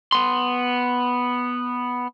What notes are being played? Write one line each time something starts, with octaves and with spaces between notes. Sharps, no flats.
B3 C6